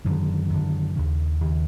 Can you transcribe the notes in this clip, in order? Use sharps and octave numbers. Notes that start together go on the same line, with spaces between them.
F#2 D3 D#3
F#2 D3
D#2 C#3
D#2 C#3